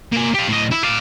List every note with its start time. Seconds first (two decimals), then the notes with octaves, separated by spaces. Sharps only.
0.12 A#3 G#5
0.34 G4 F5
0.49 A2 D#5
0.71 E4
0.83 D5 F5